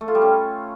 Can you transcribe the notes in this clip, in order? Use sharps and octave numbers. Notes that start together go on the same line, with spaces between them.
A3
F4
G3
C#4